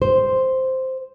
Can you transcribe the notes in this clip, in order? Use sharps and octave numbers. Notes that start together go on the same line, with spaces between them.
C5